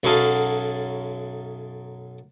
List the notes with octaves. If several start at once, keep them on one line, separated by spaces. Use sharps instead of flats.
B1 F#2 F#4 G#4 A4 F5